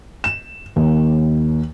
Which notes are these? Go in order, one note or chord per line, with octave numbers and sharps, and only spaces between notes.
E7
D#2